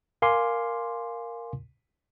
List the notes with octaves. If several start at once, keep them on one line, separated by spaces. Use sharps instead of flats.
A#4 F5 G#5 C6 D6